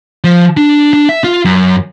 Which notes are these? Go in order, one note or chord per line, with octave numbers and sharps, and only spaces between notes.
F3
D4
D4
E5
F4
F#2